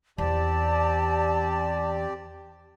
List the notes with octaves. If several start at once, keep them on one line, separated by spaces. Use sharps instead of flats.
E2 C4 G4 D5 A5